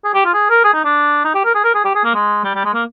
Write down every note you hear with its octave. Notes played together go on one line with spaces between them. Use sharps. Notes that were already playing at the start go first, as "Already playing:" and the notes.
G#4
G4
F4
G#4
A#4
G#4
D#4
D4
D#4
G4
A#4
G#4
A#4
G#4
G4
G#4
A#3
G#3
G3
G3
G#3
A#3